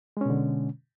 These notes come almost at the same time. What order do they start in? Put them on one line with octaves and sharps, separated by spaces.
G#3 C#4 B2 D3